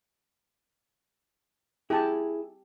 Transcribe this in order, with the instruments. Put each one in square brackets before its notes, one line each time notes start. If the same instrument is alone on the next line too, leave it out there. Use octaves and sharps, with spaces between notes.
[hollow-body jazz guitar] E4 G#4 [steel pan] G4 A5